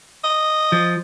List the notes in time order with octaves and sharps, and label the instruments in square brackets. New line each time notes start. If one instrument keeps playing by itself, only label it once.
[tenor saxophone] D#5
[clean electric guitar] F3